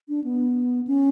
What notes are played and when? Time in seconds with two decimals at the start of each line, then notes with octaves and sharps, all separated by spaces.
0.09 D4
0.24 B3
0.87 C#4